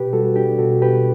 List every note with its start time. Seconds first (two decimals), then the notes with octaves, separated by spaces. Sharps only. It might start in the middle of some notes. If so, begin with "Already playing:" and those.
Already playing: B2 G4 B4
0.13 G3 F#4 A4
0.36 D4 G4
0.58 B2 F#4 A4
0.82 B2 G4 B4